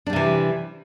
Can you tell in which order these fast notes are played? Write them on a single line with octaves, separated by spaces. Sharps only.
D4 G3 C3 E3